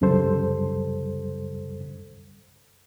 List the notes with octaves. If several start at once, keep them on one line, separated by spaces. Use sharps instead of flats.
C2 F#2 C#3 G3 A4 C5